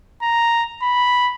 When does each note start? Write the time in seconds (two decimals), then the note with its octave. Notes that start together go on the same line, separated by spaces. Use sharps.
0.22 A#5
0.82 B5